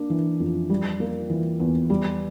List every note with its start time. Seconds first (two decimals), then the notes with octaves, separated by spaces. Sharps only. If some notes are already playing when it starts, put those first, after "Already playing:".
Already playing: A#3 D4
0.10 E3
0.40 F2
0.70 G3
1.00 A#3
1.30 E3
1.60 E2
1.90 G3